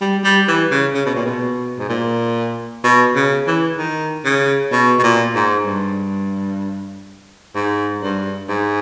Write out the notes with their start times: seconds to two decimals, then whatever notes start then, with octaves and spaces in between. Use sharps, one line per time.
0.01 G3
0.24 G3
0.48 E3
0.71 C#3
0.94 C#3
1.06 B2
1.15 A#2
1.25 B2
1.78 G#2
1.89 A#2
2.84 B2
3.15 C#3
3.47 E3
3.78 D#3
4.25 C#3
4.72 B2
4.99 B2
5.03 A#2
5.35 G#2
5.66 G2
7.55 G#2
8.02 G2
8.49 G#2